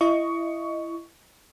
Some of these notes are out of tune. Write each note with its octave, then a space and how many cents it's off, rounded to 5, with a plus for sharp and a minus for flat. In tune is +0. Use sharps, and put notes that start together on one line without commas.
E4 +25 D#5 +0 C#6 +15